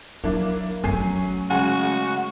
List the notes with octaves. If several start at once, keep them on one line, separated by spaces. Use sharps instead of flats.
F#3 A#3 D4 E4
F#3 A3 C#4 G#5 C7
C#3 G#3 F#4 G#5 C#6